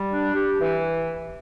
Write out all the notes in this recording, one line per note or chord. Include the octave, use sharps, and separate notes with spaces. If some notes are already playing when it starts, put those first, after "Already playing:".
Already playing: G3
D4
G4
E3